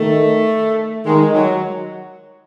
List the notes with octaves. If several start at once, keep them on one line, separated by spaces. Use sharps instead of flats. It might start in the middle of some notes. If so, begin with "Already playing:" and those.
Already playing: D#3 A3
D#3 G#3
F#3